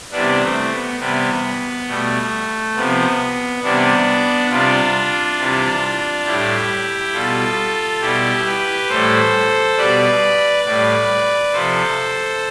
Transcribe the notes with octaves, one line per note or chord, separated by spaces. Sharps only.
C3 E3 G3 B3 D4
A3 C4
B3
C3 E3 G3 B3
B2 G3 A3
C3 F3 B3
C3 E3 G3 B3 D4
C3 G3 D4 F4
C3 E3 G3
A2 G3 E4 G4
B2 G3 F4 A4
B2 G3 E4 G4
G4 B4
A2 E3 G3 A4 C5
B2 G3 B4 D5
A2 G3 B4 D5
C3 F3 A4 C5